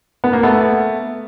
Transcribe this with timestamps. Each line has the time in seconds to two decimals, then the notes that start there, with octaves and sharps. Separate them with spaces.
0.24 B3
0.33 A#3
0.43 A3 B3